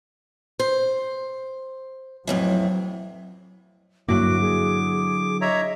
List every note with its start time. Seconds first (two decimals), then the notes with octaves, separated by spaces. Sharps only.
0.60 C5
2.27 F2 A2 E3 F#3
4.09 G2 D3 F#3 A#3 E4 F#4 D6
4.41 G#4
5.41 C#5 D#5 E5 A#5